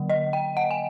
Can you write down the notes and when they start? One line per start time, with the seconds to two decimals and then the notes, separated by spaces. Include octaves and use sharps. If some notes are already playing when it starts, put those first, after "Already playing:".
Already playing: D3 F#3 A#3
0.09 D#5
0.33 G5
0.57 F#5
0.71 G#5